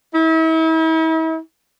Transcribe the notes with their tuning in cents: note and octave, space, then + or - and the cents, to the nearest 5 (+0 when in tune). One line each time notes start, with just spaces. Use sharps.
E4 -40